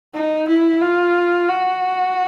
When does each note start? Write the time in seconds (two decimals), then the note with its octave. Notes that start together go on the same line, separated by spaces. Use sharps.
0.14 D#4
0.48 E4
0.81 F4
1.48 F#4